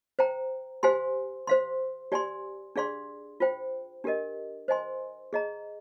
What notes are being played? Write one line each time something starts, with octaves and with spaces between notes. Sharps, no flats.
C5 G5 A#5
G4 C5 F5 G#5 C6
C5 F5 C6
G4 D5 G#5 C6
D4 G#4 D5 F5 C6
F4 C5 G5
D4 G4 A#4 D#5
C5 D#5 G#5 C6
G#4 D#5 A#5